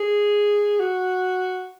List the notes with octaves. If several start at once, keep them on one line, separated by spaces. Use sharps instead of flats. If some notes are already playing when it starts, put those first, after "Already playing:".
Already playing: G#4
F#4